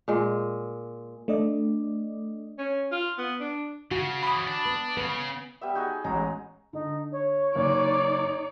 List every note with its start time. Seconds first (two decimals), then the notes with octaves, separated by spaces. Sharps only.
0.08 A#2 G#3
1.28 A3 D4 D5 D#5
2.58 C#4
2.92 F4
3.18 B3
3.40 D4
3.91 C#3 F#4
4.23 C#3 E3 B5 D#6
4.47 D4
4.66 B3
4.97 C#3 B3
5.61 G3 B3 E5
5.75 D#4 F#4 G#4
6.04 A1 F#3 G#3 G#4 A#5
6.73 D3 D#4
7.12 C#5
7.55 F#1 D#4 D5